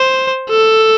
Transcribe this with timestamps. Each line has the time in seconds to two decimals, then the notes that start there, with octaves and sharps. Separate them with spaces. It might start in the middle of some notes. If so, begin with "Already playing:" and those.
Already playing: C5
0.49 A4